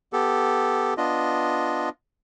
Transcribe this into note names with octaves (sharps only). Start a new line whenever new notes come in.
B3 G4 A4
B3 D4 F4 D#5